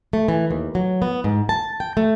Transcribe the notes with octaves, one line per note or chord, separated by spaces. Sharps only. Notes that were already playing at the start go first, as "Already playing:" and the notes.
A3
E3
D#2
F#3
B3
G#2
A5
G5
A3